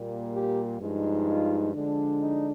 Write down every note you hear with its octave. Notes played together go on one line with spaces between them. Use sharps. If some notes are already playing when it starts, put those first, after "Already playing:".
Already playing: A#2 G3 A#3
G4
G2 F3 G#3 D#4
F4
D3 F3 G#3 D4
D#4